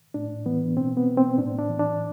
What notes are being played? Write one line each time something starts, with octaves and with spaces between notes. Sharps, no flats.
A2 D4
E3 B3
B2 C4
B3
C4
A2 D4
D4
E3
D4